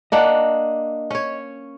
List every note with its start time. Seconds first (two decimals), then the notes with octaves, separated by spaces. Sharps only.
0.12 A#3 D4 D#5 F#5
1.11 C#4 C#5